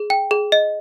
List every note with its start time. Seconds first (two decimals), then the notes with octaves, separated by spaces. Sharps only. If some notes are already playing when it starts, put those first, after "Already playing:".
Already playing: G#4
0.10 G5
0.31 G#4
0.52 D#5